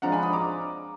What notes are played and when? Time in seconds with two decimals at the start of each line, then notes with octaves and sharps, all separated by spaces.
0.02 F3 G#3 D4 F4 F#5 A#5
0.12 G#5 B5
0.22 B5 D#6
0.33 A#5 D6